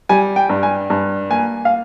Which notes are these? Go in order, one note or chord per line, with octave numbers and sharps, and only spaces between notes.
G3 G#5
G5
G2
G#5
G2
A#3 G#5
F5